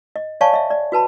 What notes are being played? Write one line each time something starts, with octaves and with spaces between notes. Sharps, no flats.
D#5
C#5 D5 F5 G#5 A5 C#6
D#5 E5
D5
F#4 B4 A5 B5